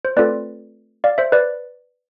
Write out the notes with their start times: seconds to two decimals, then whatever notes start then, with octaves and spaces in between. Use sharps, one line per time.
0.05 C5
0.16 A3 C4 F4 A4 B4 D5
1.04 D5 F5
1.18 C5 E5
1.32 B4 D5